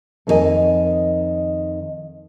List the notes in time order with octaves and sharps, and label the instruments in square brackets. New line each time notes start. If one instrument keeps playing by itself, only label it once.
[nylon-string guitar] F2 D#3 D4 F#4 D#5 G#5